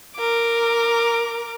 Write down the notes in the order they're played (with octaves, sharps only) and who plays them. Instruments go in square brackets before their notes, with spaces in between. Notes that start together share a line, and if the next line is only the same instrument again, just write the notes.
[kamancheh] A#4 D6